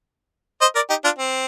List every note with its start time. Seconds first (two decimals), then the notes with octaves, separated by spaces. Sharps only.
0.61 C5 D#5
0.75 A#4 D5
0.90 D#4 G4
1.04 D4 F4
1.18 C4